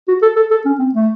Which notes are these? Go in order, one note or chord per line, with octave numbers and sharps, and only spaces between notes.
F#4
A4
A4
A4
C#4
C4
A3